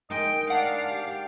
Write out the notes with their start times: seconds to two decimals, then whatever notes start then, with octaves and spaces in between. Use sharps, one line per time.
0.10 D#3 G#3 D#5 G5
0.50 D4 D5 F5 F#5
0.91 G4